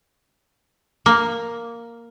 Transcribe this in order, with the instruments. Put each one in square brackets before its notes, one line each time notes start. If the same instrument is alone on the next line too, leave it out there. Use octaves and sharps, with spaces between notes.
[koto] A#3